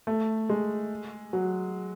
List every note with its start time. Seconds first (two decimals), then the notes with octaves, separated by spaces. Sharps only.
0.07 A3
0.49 G#3
1.33 F#3